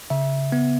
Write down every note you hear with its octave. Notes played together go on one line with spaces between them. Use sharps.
C#3 E5
B3